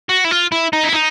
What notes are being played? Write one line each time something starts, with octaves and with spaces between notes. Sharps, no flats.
F#4
E4
F4
E4
D#4
E4
D#4